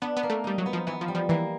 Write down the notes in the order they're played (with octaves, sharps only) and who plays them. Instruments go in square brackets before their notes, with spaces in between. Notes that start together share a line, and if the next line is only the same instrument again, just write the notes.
[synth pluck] B3 [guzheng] D4
[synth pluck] B3
[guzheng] A#3
[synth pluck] A3
[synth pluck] G3 [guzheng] D#4
[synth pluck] F#3
[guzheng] B3
[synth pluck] F3
[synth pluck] E3 [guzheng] B3
[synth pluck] F3
[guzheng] G3
[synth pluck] F3
[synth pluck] E3 [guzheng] A#3